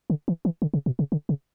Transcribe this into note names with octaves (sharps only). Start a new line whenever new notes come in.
D3
E3
E3
D3
C#3
B2
C#3
D3
C#3